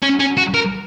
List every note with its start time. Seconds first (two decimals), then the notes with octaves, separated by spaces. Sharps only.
0.02 C#4
0.20 C#4
0.37 F#4
0.54 A#4